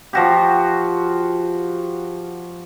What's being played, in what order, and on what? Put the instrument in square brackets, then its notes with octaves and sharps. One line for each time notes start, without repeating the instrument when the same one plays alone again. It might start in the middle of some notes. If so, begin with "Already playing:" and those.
[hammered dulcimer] F3 F#4 G4